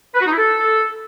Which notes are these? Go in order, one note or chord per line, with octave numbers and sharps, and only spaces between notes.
B4
F#4
D#4
E4
A4